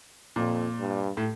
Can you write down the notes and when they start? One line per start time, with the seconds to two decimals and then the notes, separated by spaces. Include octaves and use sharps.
0.36 F2 A#2
0.79 G2
1.17 A2